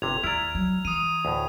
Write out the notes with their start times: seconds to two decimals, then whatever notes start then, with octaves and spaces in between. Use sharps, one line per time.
0.02 G1 C3 G#6 F7
0.24 D#2 E4 D5 A#5 E6 F6 F7
0.55 F#3
0.85 E3 D#6 D#7
1.25 D2 A2